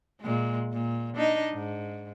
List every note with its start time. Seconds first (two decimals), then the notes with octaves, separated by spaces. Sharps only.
0.21 A#2 G#3
0.73 A#2
1.16 D4 D#4 D#5
1.53 G#2